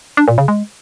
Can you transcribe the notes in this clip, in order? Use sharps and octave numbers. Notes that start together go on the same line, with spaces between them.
D4
A#2
C#3
G#3